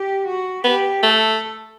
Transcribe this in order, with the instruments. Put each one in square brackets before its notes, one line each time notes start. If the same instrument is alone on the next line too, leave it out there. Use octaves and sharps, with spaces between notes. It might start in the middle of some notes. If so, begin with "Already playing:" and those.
Already playing: [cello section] G4
F#4
[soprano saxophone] B3 [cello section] G4
[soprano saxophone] A3 [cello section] A4